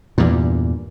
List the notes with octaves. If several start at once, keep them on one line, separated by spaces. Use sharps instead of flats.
E2 G2 A#2